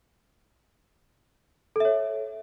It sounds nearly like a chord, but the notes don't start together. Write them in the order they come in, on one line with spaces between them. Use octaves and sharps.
A4 E5 C#5